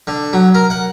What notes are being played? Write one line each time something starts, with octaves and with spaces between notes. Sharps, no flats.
D3
F#3
A#4
F#5